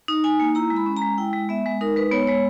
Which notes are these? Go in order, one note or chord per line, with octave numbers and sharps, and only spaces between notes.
D#4
D#4 G#5
A#3
E4 A#5
G#3
B5
C#4
A#5
G#3
E4 G5
G#3
B3 E5
G#3
D#4 A#4
G#3 B4
B3 C#5
G#3 C#5